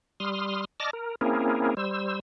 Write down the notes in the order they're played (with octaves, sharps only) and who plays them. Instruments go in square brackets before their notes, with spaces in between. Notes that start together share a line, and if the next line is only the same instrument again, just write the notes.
[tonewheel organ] G3 C6 D#6 F6
D5 D#5 A5 D6 F6 A#6
A#4
A#3 C4 C#4 E4 G#4 A#4
G3 C5 E6